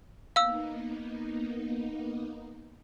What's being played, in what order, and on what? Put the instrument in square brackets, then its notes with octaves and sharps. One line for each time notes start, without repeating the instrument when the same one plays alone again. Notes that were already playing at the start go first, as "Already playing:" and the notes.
[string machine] A#3 B3 D#4 [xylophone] F5 E6